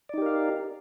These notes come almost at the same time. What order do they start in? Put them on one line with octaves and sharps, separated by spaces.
D5 D#4 G4 A#4 F5